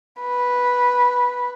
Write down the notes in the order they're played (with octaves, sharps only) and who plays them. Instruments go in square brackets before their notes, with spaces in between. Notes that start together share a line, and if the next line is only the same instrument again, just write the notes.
[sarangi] B4